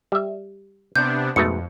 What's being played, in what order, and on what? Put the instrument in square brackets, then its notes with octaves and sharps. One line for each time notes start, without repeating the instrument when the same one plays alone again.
[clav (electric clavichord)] G3 E5
[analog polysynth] C3 B3 D4 [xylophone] G6
[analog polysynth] F2 [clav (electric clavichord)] G#2 B2 A3 [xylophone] C#7